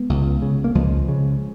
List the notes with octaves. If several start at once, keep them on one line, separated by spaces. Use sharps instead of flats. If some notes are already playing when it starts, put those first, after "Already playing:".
Already playing: G#3 B3
C#2
C#3
A#3
C#2 F3 G#3
C#3